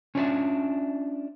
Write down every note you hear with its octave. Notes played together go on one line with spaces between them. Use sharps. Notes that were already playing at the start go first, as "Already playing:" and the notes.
C#4 D4 F4 C#5 D5 E5